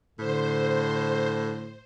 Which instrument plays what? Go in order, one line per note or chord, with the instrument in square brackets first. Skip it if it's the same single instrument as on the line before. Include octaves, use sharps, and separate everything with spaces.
[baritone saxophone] A2 [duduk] D3 [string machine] C5